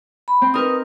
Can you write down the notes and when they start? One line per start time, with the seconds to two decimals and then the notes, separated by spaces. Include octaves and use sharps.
0.28 B5
0.42 C4
0.54 D#4 A#4 B4 D#6